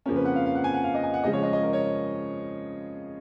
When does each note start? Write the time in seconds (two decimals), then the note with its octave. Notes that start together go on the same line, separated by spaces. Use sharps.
0.06 F2 C#3 F3 A#3 C#4 A#4
0.16 B4
0.25 F#5
0.36 F5
0.46 F5
0.55 F#5
0.64 G#5
0.74 F#5
0.84 F5
0.94 D#5
1.03 G#5
1.14 F#5
1.24 C#3 F3 G#3 D#5
1.33 C#5
1.43 D#5
1.53 D#5
1.63 A#4
1.73 C#5